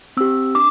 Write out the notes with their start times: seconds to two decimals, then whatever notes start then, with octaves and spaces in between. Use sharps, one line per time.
0.17 C4 G4 E6
0.55 D4 D6